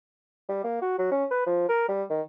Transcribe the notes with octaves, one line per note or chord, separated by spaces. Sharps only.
G3
A#3
F#4
F#3
C#4
B4
F3
A#4
G3
D#3